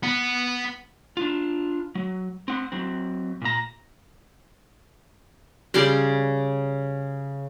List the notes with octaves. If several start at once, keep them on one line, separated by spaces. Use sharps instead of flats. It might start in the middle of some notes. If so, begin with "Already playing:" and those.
B3
D4 F4
F#3
C4 F#5
F#3 C4
A#2 A#5
C#3 G3 D5 C6